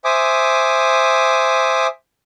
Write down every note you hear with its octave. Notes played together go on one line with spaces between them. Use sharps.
C5 E5 G#5 D6 D#6